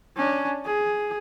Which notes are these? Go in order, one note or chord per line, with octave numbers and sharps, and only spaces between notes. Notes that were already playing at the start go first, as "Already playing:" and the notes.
C#4 D4
G#4